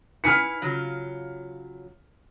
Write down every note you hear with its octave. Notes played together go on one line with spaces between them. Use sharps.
E4 B4 G#5 F6 B6 C#7
C#3 F#3 F4